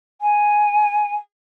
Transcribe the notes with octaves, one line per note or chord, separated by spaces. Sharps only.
G#5